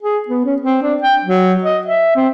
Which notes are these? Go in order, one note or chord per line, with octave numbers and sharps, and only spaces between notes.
G#4
B3
C#4
C4
D4
G5
F#3
D#5
E5
C4